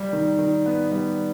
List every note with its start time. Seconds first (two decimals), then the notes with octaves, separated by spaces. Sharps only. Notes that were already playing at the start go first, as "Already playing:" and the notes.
Already playing: G3
0.13 D#3
0.39 D#3
0.66 B3
0.91 G3